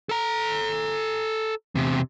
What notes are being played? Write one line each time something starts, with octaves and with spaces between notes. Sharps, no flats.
A4 A#5
E2 C3